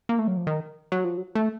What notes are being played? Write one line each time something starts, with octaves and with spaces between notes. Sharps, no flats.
A#3
A3
F#3
F3
D#3
F#3
F3
F#3
A3